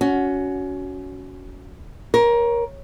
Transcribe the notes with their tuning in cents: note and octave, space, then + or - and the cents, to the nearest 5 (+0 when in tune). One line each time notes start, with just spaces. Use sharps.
C#4 +20 F#4 +0
A#4 +20 C#5 -15